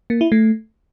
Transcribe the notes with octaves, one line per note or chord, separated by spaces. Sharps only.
A#3
E4
A3